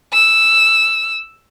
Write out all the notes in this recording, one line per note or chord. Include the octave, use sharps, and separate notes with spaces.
E6